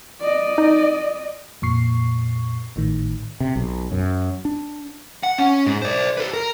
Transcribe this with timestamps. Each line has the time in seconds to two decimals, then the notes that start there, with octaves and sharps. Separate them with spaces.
0.21 D5 D#5
0.58 D#4
1.62 F2 A#2 C#6 C7
2.76 G#1 A2 D#3
3.40 C3
3.56 B1
3.92 F#2
4.45 D4
5.23 F#5
5.38 C#4
5.66 G#2
5.82 C5 D5
6.17 A4 B4
6.33 A#4